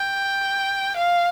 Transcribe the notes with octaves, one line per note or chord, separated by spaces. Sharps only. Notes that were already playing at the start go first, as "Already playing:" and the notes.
Already playing: G5
F5